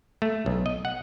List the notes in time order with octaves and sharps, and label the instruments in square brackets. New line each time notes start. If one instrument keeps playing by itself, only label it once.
[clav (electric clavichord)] A3
B1
D#5
F#5